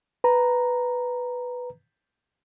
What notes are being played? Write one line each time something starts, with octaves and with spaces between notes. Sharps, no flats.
B4 A#5